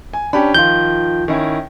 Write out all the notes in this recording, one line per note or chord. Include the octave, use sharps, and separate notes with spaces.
G#5
C#4 D4 G4 B5
D#3 F3 F4 G6
D#3 C#4 E4